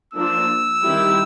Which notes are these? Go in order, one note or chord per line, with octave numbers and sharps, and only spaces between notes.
F3 A#3 D4 E6
D#3 G3 C4 E4 G4